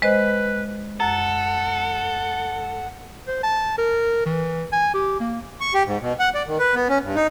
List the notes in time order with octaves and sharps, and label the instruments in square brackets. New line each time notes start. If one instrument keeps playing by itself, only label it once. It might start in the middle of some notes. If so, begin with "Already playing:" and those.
[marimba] G#3 C5 D#5 [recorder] B4
[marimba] F#2 [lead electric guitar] A4 [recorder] F#5
[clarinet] C5
A5
A#4
E3
G#5
G4
A#3
[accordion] C#6
G4
G#2
B2
F#5
D5
D#3
B4
B3
C#4
G2
D#4